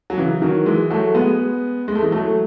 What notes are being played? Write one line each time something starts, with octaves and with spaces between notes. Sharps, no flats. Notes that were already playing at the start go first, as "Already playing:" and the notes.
F#3
C#3 E3
D#3 F#3
E3 G#3
F#3 A3
G#3 B3
G#3
A3
E3 G#3
F#3 A3